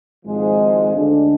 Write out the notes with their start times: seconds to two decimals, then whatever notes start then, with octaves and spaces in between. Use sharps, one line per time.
0.25 G#1 G#2 F3 G#3
0.93 D2 D3 G#3 D4